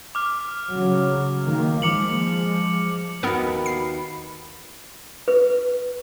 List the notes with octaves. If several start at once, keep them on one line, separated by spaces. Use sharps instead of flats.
D6 F6
C#3 F#3
D#3 A#3
F3 G#3 D6 C#7 F#7
D#2 B3 D#4 F#4 A#4 B4 B5
C7
B4